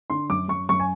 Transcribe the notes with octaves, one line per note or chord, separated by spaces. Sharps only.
D3 C6
F#2 D6
F#2 C#6
F#2 C#6
G#5